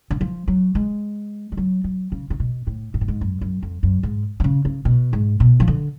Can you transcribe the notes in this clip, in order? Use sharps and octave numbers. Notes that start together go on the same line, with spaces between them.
D3
F3
F#3
G#3
G#3
F#3
F#3
C#3
C#3
B2
A2
G#2
A2
G#2
F#2
F#2
F2
F#2
G#2
D3
C#3
C#3
B2
G#2
B2
F3
D3